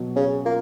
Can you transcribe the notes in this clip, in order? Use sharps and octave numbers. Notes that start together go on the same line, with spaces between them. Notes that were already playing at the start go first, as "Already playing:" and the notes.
Already playing: B2 F#3
C#3 C#4
A#3 F4